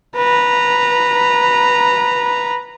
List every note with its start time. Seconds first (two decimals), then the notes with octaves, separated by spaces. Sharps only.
0.17 B4 A#5